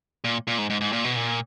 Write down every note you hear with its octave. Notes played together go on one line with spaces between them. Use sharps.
A#2
A#2
G#2
G#2
G#2
A#2
B2
A#2